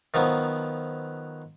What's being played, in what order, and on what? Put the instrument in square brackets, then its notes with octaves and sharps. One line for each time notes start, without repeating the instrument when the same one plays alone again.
[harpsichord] D#3 F3 F#3 B3